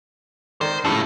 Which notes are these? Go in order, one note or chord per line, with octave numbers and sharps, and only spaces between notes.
D#3 C5 D5
G2 C#3 F3 A3 E4